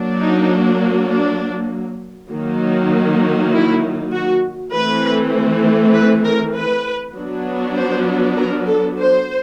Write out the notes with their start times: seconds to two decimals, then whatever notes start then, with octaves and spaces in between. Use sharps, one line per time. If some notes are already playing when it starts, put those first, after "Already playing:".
Already playing: F#3 A#3 D4
0.18 D#4
1.09 D4
2.30 D#3 F#3 A#3
3.52 E4
4.12 F#4
4.73 E3 A3 C4 B4
5.94 B4
6.25 A#4
6.54 B4
7.15 F#3 B3 D4
7.76 C5
8.37 A#4
8.68 A4
8.97 C5